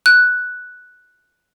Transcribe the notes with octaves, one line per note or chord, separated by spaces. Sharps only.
F#6